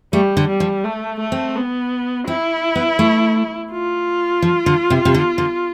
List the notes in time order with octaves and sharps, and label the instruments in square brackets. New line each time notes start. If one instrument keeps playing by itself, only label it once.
[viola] G3 [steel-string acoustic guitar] A3
[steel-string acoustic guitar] D3
[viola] G3
[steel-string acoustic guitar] F3
[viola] A3
A3
[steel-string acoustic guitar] C4
[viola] B3
[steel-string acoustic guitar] C4 [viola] E4
[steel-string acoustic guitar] B3
A3
[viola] F4
[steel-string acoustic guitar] F3
D3
C3
C3
D3
D3